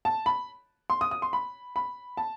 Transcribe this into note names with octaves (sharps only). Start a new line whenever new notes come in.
A5
B5
C6
D#6
D#6
C6
B5
B5
A5